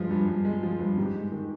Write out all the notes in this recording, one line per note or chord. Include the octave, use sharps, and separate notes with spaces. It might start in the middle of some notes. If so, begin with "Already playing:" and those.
Already playing: G2 F3 G#3 G#4
G2
G2
G#3
F3
G2
G#2 G4
G#3
D#3